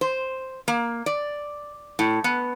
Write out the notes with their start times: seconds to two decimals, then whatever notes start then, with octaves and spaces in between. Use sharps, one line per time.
0.01 C5
0.68 A#3
1.06 D5
1.99 A2
2.24 B3